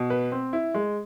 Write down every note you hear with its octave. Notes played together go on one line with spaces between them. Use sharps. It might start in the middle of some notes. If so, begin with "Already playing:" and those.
Already playing: B2
B4
C4
E4
G#3